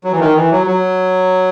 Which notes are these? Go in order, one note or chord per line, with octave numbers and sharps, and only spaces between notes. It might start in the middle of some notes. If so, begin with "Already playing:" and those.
F#3
E3
D#3
E3
F#3
F#3